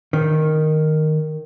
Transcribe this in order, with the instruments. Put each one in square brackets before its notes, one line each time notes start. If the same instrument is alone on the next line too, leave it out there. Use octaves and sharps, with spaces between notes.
[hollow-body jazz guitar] D#3